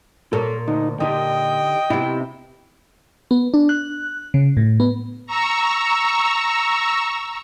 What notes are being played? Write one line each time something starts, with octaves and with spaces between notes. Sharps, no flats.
A#2 A4 A#4 C#5
D2 D#4
A#2 D3 D#4 G4 D#5 G5
C3 B3 D#4 E4 G4
B3
D4
F#6
C#3
A2
B3
A#5 C#6 E6